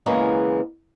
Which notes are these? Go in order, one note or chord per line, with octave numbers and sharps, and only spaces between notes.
C#3 E3 G#3 A#3 B3